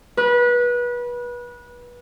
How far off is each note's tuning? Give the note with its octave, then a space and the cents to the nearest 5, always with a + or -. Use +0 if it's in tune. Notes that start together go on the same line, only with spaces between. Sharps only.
B4 -25